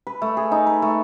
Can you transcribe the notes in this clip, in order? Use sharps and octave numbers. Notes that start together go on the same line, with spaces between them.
B4
A3
G#4
D#4
B4
A3